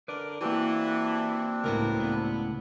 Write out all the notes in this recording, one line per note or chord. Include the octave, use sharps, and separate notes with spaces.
D3 A#4 B4 D5
E3 A#3 C4 D4 F#4 G4
C#2 A2 B3 A#4
B3